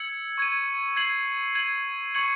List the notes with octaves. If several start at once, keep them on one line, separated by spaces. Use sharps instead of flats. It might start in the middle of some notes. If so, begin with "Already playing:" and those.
Already playing: E6 G#6 C#7 F#7
C#6 G#6 D#7
G#6 C7 F#7
G#6 D#7 F#7
C#6 G#6 C#7 F#7